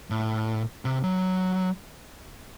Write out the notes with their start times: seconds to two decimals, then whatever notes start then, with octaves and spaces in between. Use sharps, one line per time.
0.10 A2
0.85 C3
1.03 F#3